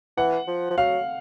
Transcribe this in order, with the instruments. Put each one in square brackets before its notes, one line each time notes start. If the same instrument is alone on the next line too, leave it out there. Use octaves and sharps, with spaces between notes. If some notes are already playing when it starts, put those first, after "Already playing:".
[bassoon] E3 [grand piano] F#5
[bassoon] F3
F3
[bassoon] F#3 [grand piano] F5